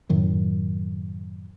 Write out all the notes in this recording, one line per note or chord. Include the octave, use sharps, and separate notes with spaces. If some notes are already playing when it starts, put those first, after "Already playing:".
F#2 A2 D#3 F#3